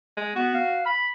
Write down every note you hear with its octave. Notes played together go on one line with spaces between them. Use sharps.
G#3
B3 F#4
F5
B5